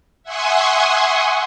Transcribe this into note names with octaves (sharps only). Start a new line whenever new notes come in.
E5 F#5 G#5 C6 C#6 D#6